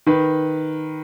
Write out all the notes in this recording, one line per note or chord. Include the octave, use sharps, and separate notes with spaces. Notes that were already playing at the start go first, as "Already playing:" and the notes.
D#3 B4